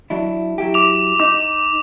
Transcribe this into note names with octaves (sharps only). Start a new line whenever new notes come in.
F#3 D4 E4
F#3 E4 G4
D6 F7
D#4 D6